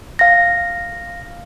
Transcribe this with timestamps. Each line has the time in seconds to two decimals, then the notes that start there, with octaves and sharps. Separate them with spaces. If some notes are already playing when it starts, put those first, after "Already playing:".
0.19 F5 A#6